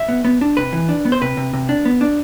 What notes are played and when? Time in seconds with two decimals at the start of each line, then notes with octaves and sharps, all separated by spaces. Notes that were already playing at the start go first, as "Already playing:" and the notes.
Already playing: E5
0.09 B3
0.25 B3
0.41 D4
0.57 C3 B4
0.73 E3
0.89 D4
1.05 B3
1.12 C5
1.22 C3 B4
1.37 C3
1.54 C3
1.69 D4
1.86 B3
2.01 D4